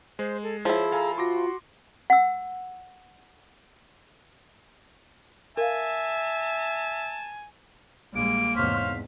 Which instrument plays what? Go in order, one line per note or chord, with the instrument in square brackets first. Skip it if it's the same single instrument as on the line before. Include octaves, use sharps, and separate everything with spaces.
[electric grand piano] G#3 [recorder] C5
[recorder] A4
[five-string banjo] F3 E4 [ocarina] G#4 [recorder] C#5
[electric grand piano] A4 F5 G#5 [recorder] A#5
[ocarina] F4 [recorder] F#4 [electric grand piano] C6 D6 A#6
[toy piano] F#5 E6
[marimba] A#4 F5 [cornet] E5 [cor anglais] G#5 [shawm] A5
[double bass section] A#1 G3 G#3 [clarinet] A#3 [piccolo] D7
[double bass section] E2 G#2 C3 [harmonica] C5 C#5 F5 [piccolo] B6